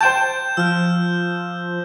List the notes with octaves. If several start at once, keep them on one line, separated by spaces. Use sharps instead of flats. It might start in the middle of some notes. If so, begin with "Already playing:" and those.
C5 G5 A5 G6 E7
F3 E6 F6